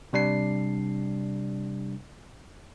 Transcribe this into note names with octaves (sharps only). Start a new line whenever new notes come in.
C3 G3 D4 C7